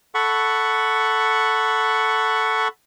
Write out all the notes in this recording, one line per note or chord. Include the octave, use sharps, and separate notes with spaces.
A4 F#5 B5 C#6